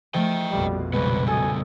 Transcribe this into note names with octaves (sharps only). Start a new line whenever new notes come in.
F3 A3 D#5 G5
A#1 F2 B2 G3
C#3 G3 G#3 B3 B4
A4 G#5 D#6